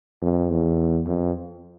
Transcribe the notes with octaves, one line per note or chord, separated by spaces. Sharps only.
F2
E2
F2